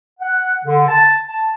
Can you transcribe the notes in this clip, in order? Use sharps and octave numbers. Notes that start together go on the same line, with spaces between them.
F#5
D3
A5
A5